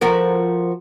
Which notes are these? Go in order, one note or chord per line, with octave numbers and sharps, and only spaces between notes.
F3 F#4 A#4